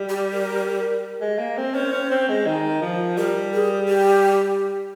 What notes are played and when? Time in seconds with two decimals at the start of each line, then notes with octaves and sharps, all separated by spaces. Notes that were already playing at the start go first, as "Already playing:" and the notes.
Already playing: G3
0.09 G4
0.33 A#4
1.21 G#3
1.39 A#3
1.58 C4
1.75 C#4 C5
1.93 C#4
2.11 C4
2.29 G#3
2.46 D#3
2.82 F3
3.17 G3 A#4
3.54 G#4
3.89 G4